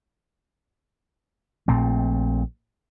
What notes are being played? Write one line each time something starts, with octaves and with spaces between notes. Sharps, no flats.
A#1 A#2 A3 C4